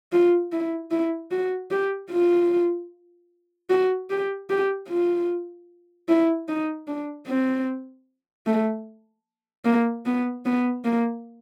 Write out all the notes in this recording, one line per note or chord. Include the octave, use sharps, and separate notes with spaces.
F4
E4
E4
F#4
G4
F4
F#4
G4
G4
F4
E4
D#4
D4
C4
A3
A#3
B3
B3
A#3